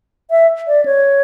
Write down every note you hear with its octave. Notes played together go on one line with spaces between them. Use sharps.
E5
D5
C#5